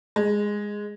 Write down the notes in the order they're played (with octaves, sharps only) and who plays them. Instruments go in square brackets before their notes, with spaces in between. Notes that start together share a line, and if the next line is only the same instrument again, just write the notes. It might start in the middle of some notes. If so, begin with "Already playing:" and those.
[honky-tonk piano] G#3